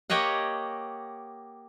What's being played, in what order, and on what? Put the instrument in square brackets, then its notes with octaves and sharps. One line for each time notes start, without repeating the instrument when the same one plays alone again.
[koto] A#3 G4 C#5 D#5 F#5